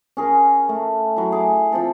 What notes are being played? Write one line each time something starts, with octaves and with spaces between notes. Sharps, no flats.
C#4 G#4 A#4
A3
F#3 E4
G#4 D6
F3 C4 A4